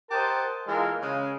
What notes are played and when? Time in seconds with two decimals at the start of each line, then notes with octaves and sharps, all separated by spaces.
0.10 G4 A#4 C5 D#5 F#5 A5
0.67 E3 G#3 A#3 F4 A4 A#4
1.00 C#3 G#3